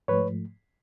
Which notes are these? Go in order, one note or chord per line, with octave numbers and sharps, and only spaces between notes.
G#2 F3 A3 B4 C#5